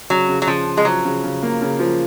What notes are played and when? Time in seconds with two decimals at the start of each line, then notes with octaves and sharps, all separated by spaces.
0.10 C#3 F#3
0.29 C#3
0.42 F#3
0.47 C#3 F3
0.67 C#3
0.77 G#3
0.85 F3 F#3
1.05 C#3
1.24 C#3
1.43 A#3
1.62 C#3
1.79 F3